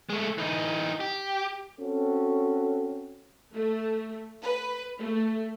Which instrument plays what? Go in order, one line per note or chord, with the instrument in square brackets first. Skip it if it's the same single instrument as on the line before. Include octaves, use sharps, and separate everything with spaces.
[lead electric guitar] G#3 A3
E3 D#4
G4
[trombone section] C4 C#4 F#4 A4
[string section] A3
B4
A3